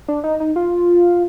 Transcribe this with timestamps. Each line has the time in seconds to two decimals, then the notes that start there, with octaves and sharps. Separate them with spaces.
0.08 D4
0.24 D#4
0.40 D#4
0.56 F4